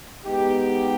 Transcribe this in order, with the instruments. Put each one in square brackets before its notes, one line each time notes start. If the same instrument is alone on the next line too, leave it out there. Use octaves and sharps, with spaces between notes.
[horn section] G#3 B3 D#4 G4